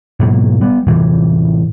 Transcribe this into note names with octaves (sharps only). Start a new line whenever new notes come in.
G#2 B2 F#3 A#3
G3 B3
A2 C3 E3 G3